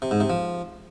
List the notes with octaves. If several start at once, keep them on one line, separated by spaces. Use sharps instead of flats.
C3
G#2
C3
F3